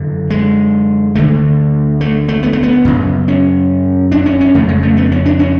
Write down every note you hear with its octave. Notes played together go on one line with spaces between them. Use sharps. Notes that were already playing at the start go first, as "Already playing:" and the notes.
Already playing: F#2 D3
G#3
D2 D3 A3
A3
A3
B3
A3
B3
F#2 C#3
C#4
D4
C#4
C#4
F2 C#3 A3
G#3
A3
B3
C#4
D4
C#4